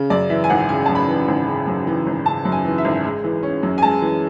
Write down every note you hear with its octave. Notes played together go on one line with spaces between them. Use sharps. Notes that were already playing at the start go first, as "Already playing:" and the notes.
Already playing: C#3
F#2 D5
E3 E5
G#5
G#1 F#5
C#3 G#5
F#2 A5
B5
E3
G#1
C#3
F#2
E3
G#1
C#3 A5
F#2
G#5
E3
E5
G#1
G#3
E3
C#4
F#2
G#5
G#3 A5
E3